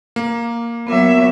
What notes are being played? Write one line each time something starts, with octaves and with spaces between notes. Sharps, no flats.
A#3
F#3 B3 A#4 E5 D6